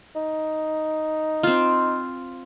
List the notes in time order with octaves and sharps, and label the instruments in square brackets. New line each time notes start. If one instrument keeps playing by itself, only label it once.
[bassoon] D#4
[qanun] C4 F4